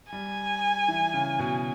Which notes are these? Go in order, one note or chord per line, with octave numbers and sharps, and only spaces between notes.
G3 G#5
E3
C#3
B2